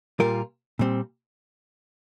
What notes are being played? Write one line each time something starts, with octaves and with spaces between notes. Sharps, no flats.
A#2 G3 A#3 F4 A#4
A#2 G3 C4